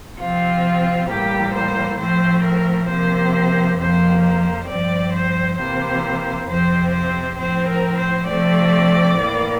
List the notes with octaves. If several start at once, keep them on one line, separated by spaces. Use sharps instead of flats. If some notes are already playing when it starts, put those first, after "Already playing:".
C3 F3 C4 F4
A2 E3 G3 A#3 G4
C5
A2 F3 A3 C4 C5
A#4
C3 F3 A#3 C5
F2 C3 F3 A#3 C5
C5
G2 F3 C4 D5
C5
C3 E3 A#3 C5
F2 C3 F3 C4 C5
C5
A2 F3 C4 C5
A#4
C5
C3 F3 A3 C4 D5
A2 E3 A#3